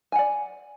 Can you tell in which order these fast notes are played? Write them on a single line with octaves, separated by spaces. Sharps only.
G#5 F#5 D5